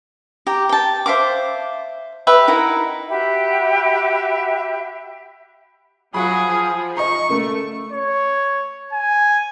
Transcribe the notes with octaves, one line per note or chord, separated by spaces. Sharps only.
G4 A#5
G5 A5
C5 E5 F5 D6
G4 B4 E5
D#4 E4 A#4 F#5
F#4 G4 E5 B5
F#3 F4 G#4 F#5 B5
F3
D#5 A#5 C#6
C#3 A3 A#3
C#5
G#5